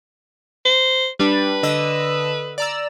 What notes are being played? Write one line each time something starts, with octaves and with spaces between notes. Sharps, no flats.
C5
G3 D4 B4
D3 D#5 E6
D5 A#5 E6